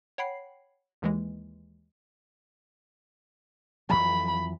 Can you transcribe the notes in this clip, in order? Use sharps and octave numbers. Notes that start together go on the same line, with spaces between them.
C#5 F#5 G5 B5 C7
D#2 E3 G#3
F2 E3 F#3 B5